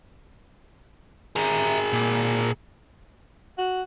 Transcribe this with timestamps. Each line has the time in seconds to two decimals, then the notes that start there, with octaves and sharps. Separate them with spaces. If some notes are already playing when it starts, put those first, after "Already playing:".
1.36 G#4 A#4 E5 A#5
1.93 A#2
3.58 F#4